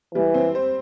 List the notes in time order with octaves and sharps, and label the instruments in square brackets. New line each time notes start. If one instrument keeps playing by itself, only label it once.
[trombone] E3 [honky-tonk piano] G3
[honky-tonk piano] C4
C5